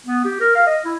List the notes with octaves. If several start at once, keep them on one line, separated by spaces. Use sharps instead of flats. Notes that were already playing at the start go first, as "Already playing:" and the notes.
B3
G4
A#4
F5
D#5
E4